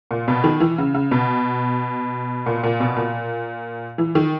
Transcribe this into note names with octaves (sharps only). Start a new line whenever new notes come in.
A#2
B2
D#3
E3
C#3
C#3
B2
A#2
A#2
B2
A#2
E3
D#3